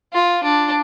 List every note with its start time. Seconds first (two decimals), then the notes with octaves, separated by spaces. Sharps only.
0.13 F4
0.43 D4